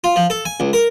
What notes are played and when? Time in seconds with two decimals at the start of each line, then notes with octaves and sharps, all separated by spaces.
0.04 F4
0.16 F3
0.30 A4
0.45 G#5
0.60 C#2
0.73 A#4